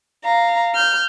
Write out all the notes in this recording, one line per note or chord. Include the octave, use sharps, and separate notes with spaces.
F5 A#5
F6 G6